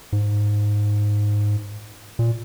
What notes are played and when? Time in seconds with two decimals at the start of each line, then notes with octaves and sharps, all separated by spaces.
0.13 G#2
2.19 A#2